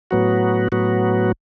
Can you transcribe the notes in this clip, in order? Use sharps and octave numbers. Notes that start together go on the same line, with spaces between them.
A2 F#3 B3 F#4
A2 F#3 B3 F#4